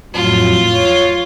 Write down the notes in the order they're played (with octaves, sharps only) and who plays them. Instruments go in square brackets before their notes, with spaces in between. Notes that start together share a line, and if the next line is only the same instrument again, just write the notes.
[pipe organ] F2 A2 F#3 [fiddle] F4
[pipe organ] C#5